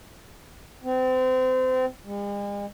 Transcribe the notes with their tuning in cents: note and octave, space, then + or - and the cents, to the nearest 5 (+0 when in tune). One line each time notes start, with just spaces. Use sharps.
C4 -30
G#3 -45